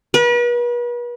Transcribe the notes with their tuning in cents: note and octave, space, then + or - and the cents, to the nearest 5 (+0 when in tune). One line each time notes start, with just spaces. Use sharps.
B4 -40